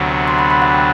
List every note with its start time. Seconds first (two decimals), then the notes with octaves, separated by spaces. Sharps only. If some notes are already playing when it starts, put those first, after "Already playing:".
Already playing: D2 C3 F#3 B3 D4
0.28 C6
0.38 B5
0.50 B5
0.62 F#5
0.73 G5